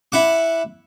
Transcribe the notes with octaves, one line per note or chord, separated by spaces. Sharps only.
E4 F#5 D6